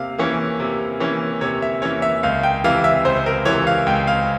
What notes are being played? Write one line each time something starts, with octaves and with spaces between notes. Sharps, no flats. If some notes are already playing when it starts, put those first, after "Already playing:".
Already playing: C3 A#3 F5
E3 A#3 C#4
C3
E3 A#3 C#4
C3 C#5
E5
E3 A#3 C#4 C#5
E5
C#2 F5
G5
C3 E3 F5
E5
C#2 C5
A#4
C3 E3 C#5
F5
C#2 G5
F5